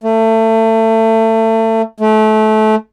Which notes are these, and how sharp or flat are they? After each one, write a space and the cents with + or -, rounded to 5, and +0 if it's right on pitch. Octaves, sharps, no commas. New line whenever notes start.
A3 +25
A3 -25